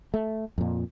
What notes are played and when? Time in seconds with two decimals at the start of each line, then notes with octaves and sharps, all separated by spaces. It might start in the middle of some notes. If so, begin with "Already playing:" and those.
0.14 A3
0.58 F2 A#2